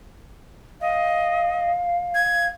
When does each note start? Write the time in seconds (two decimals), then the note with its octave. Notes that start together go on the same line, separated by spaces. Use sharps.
0.81 D#5 F5
2.15 G#6